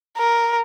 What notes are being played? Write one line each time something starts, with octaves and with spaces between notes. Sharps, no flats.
A#4